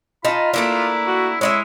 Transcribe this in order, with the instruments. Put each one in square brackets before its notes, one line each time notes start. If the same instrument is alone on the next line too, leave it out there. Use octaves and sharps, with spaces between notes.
[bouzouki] D#4 A5 [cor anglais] F4 [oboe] B5
[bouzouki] A3 A#3 D4 [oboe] E4
[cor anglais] F#4
[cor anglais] G#3 [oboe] E4 [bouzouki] C#5 D5 E5